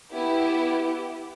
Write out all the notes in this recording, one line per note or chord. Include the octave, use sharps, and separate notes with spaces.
B3 E4 G4